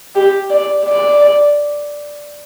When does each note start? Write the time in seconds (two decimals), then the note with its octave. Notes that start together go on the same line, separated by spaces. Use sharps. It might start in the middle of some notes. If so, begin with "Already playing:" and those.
0.15 G4
0.50 D5
0.85 D5